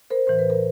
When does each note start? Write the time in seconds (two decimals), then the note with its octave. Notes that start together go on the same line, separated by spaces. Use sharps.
0.10 A#4 C5
0.27 A2 E3 C5
0.39 B4
0.50 A#4